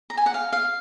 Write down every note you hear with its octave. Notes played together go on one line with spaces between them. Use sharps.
A#5
G#5
F#5
F5
F5